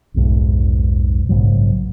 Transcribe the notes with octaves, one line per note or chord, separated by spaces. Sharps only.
F1 B1 G#2
A#1 G#2 C#3 F#3